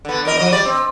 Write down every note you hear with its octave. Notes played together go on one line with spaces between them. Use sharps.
D3 B3
E2 A#4 D#5
F3 D#5
G3 D5
C4